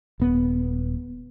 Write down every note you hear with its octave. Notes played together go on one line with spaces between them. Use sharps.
D#1 B3